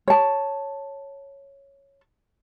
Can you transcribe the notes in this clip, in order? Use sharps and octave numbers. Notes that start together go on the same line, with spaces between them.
C#5 A5